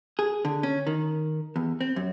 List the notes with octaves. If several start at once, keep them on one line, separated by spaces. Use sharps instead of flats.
G#4
D3
C#4
D#3
E2
C4
F#2